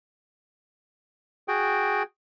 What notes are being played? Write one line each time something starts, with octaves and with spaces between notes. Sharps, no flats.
F#4 G#4 G5